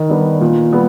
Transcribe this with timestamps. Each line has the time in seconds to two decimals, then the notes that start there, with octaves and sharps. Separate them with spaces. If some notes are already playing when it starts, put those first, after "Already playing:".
Already playing: D#3
0.10 G3 B3 D4
0.41 A#2
0.73 G3 B3